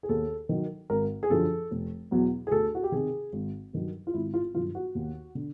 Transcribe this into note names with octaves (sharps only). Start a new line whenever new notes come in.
G#4
D#2 A4
D#3 F#3
G#1 A#4
G#4
F#2 D3 F3 A4
F1
E2 B2 F#3
G#4
D2 A4
F#4
G4
C3 D#3 G#4
G#1
G2 D#3 F#3
F4
G#1 E4
F4
G2 D#3 F#3 F4
F#4
D#2
D3